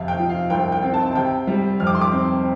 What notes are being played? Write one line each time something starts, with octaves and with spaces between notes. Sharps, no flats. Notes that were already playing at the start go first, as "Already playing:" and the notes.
Already playing: F2 C3 F5
G5
F3
F5
C2 G5
G5
C4
A5
C3 G5
G3
F2 F6
D6
C6
D6
C4